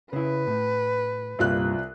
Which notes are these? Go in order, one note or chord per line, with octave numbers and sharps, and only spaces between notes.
C#3 E4 B4
A2
C2 G2 A#2 G3 F4 F#6